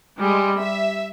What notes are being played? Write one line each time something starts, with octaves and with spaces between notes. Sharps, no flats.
G3 G#3
E5